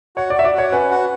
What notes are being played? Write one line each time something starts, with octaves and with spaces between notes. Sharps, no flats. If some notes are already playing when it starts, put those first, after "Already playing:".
F#4 C#5
D5
F#4 E5
D5
F#4 C#5
C#4 B4
F#4